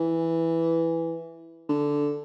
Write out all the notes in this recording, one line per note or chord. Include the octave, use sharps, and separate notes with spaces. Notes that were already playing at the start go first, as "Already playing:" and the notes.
Already playing: E3
D3